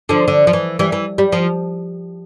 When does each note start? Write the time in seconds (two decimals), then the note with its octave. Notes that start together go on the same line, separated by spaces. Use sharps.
0.09 D3 F3
0.28 D3
0.47 F3
0.53 E3
0.79 E3 G3
0.92 E3
1.18 G3
1.32 F3